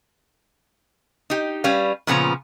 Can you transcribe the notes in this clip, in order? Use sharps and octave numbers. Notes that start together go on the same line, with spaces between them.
D#4 G4
G3 C#4 B4 F5
A#2 C#3 F3 B3 C#4 A#5